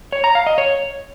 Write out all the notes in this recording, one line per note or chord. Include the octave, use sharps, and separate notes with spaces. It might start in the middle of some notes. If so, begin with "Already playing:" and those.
C#5
A#5
F5
D#5
C#5